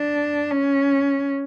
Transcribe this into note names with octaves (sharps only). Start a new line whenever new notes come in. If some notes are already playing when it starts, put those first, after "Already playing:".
Already playing: D4
C#4